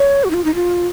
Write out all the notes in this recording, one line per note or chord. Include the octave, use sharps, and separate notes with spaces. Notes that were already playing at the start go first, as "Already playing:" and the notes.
Already playing: C#5
F#4
D#4
F4
D#4
F4